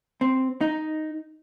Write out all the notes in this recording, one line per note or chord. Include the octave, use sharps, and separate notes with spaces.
C4
D#4